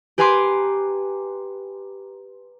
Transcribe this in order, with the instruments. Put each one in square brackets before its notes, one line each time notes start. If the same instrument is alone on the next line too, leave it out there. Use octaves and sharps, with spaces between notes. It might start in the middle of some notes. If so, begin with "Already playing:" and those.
[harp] G4 B4 G#5 A#5 C6 D6